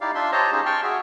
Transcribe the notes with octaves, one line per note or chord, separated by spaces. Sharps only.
D#4 E4 G4 D5 F5
D4 F4 E5 C6
G4 C5 C#5 D#5 A5 A#5
C#4 D#4 F4 G4 G#4
G5 A5 C6 C#6 F6
F#4 G#4 E5